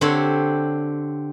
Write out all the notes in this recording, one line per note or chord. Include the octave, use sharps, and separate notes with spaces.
D3 C4 D4 G4 C5 C#5